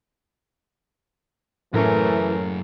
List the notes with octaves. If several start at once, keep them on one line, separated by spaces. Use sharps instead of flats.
F#2 A2 E3 A3 C#4 G#4 A#4